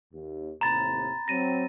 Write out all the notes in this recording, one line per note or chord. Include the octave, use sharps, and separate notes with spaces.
D#2
D#2 A2 C3 A#5 B5 A6
F#3 C4 A#6 D#7